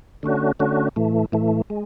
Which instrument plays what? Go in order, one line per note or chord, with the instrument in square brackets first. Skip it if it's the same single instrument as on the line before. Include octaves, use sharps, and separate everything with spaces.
[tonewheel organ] D3 A3 C#4 F#4
D3 A3 C#4 F#4
A2 E3 A3
A2 E3 A3
G#3